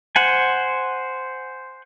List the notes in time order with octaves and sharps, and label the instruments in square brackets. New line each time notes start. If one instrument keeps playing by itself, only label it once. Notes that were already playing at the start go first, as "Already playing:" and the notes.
[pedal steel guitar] C5 F#5 G#5